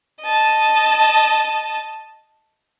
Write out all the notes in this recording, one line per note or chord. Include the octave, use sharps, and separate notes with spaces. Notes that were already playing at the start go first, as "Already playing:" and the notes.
D#5 A5